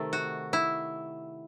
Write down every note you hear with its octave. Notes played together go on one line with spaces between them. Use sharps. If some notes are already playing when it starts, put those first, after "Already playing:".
Already playing: C3 D#3 A3
F#4
E4